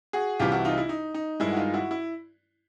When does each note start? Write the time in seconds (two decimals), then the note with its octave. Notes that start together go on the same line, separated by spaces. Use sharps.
0.13 F#4 G#4
0.39 C2 C3 E3 F4 G4
0.52 E4 F#4
0.65 D#4 F4
0.78 E4
0.89 D#4
1.14 D#4
1.40 G2 D#3 G#3 E4
1.52 F#4
1.57 D#4 F4
1.74 E4 F#4
1.91 E4